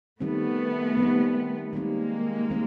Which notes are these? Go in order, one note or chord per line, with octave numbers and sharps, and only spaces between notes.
D#3 G3 A3 B3 C4
D#3 G3 C4
D#3 G3 G#3 A#3 C4
D#3 G3 C4